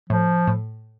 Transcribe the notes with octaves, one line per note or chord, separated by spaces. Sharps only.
A2 F3
A2